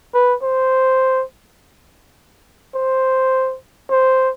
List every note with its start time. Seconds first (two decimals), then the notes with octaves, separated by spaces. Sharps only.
0.14 B4
0.43 C5
2.75 C5
3.91 C5